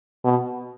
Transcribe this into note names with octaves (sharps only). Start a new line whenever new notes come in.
B2